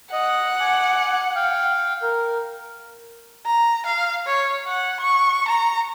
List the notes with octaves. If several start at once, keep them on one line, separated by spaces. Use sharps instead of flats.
D#5 F#5
G#5 D6
F5 G5
A#4
A#5
F5
C#5
F#5
C#6
A#5